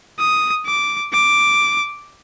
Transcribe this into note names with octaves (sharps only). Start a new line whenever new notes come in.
D#6
D6
D6